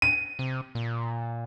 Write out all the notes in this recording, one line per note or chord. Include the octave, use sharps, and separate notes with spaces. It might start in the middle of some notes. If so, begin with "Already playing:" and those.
D#7
C3
A#2